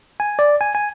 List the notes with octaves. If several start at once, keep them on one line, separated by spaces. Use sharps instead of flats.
G#5
D5
G#5
G#5